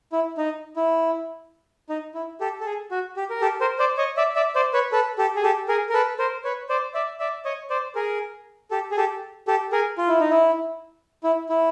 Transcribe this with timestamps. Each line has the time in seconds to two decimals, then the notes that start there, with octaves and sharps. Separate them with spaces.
0.12 E4
0.38 D#4
0.76 E4
1.90 D#4
2.15 E4
2.40 G4 A4
2.60 A4
2.65 G#4
2.91 F#4
3.17 G4
3.30 A#4
3.41 G4 A4
3.61 A#4 C5
3.78 C5 D5
3.97 C#5 D#5
4.17 D5 E5
4.35 D5 E5
4.55 C5 D5
4.74 B4 C#5
4.92 A4 B4
5.18 G4 A4
5.36 G#4
5.43 G4 A4
5.68 G#4 A#4
5.89 A#4
5.94 A4 B4
6.19 A#4 C5
6.44 B4 C#5
6.69 C5 D5
6.94 D5 E5
7.20 D5 E5
7.45 C#5 D#5
7.70 C5 D5
7.95 G#4 A#4
8.71 G4 A4
8.91 G#4
8.97 G4 A4
9.48 G4 A4
9.72 G#4 A#4
9.98 F4
10.08 E4
10.20 D#4
10.30 E4
11.24 E4
11.49 E4